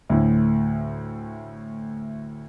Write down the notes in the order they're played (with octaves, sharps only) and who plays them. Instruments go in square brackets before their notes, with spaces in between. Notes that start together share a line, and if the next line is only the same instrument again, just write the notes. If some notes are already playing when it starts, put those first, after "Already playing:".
[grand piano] D2 A2